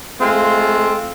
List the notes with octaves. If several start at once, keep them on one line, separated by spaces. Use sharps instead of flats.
G#3 A3 C4 F4